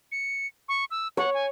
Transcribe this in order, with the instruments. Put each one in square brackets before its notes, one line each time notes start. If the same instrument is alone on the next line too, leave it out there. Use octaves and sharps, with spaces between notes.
[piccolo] C#7
C#6
E6
[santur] C#5 [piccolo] F#5
[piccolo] G#5